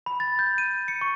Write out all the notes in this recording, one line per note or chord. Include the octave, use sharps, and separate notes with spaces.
B5
A6
G6
D#7
C#7
C#6